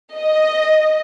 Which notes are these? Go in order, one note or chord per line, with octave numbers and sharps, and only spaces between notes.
D#5